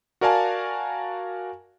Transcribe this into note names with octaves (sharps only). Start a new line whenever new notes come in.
F#4 A#4 D5 F5 G#5 A5